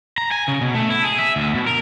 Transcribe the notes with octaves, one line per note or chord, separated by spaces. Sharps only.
A#5
G#5
C#3
B2
A3
E4
G#4
E5
D2
B2
A#4